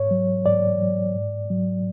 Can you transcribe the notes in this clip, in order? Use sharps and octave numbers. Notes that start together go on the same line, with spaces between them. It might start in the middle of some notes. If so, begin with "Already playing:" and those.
Already playing: G#2 C#5
F#3
G#2 D5
F#3
G#2
F#3